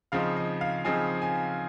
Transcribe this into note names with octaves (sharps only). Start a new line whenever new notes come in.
C#3 F3 C4 D#4 F5
D#5
F5
C#3 F3 C4 D#4 G#5
G#5